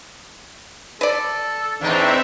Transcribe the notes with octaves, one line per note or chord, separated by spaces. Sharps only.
A4 B4 D5
E2 A2 C4 D4 D#4 E5